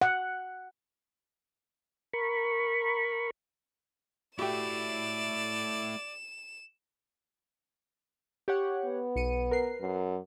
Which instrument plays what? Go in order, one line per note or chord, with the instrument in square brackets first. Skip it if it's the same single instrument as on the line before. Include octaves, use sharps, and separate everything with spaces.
[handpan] F#5
[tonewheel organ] A#4 B5 C#6
[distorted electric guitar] A3 E4 [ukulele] F#4 G4 [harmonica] D5 [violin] E7
[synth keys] G4 C#5 F#5
[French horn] B3
[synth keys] B1 C#7 D#7
A#4 B4 C7
[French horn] F#2